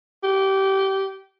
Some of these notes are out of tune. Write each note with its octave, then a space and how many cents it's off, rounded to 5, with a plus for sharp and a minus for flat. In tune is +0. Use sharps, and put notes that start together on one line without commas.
G4 -20